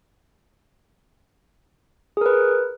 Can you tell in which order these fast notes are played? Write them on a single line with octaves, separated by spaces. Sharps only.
G#4 A#4 B4